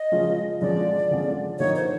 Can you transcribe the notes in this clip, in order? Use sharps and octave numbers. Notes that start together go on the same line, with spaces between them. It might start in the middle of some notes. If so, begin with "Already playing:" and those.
Already playing: D#5
C#3 F3 G#3 C#4 F4
D3 F3 G#3 C#4 D5
D3 F3 G#3 C#4
D3 F3 A#3 D#4 C#5
C5